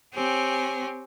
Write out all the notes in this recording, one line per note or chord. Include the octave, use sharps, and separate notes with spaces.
C4 G4 C#5 G#5